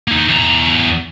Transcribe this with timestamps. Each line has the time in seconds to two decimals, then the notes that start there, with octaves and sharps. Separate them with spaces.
0.08 A#3 D#4
0.29 E2 A#5